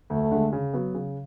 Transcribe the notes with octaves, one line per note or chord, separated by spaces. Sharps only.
D2 A3
D3 G#3
C#3
F#3 B3
C#3